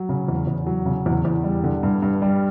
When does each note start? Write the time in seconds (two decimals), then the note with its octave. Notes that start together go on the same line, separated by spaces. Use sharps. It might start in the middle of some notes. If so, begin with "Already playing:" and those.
Already playing: F#3
0.09 C#3
0.28 E2
0.47 E2
0.67 F#3
0.86 C#3
1.06 E2
1.25 E2
1.44 G3
1.64 D3
1.83 G2
2.02 G2
2.22 G3